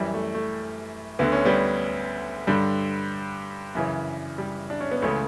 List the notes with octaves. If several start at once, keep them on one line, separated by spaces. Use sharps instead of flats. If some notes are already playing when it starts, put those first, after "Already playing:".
Already playing: F#2 E3 G3
A3
A3
D2 D3 B3
C#4
G3 B3
G2 D3 G3
F#2 C#3 E3
G3
D4
C#4
B3
C#2 C#3 E3 A3